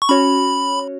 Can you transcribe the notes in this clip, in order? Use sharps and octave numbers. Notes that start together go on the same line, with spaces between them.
C#6
C#4 F#4 C#5 B5